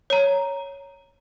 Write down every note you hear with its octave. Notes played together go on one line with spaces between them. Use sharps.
C#5 A#5